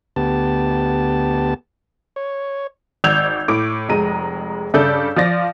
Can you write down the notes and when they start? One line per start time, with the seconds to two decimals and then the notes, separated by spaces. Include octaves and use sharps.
0.16 D2 B3 G4 A5
2.16 C#5
3.04 G#1 D5 E6 G6 G#6 F7
3.48 A2 D6 D7
3.89 F1 F2 G#3 A#5 D#7
4.74 G2 C#3 A4 D5 E6 G6
5.16 F3 F4 D5 A6 A#6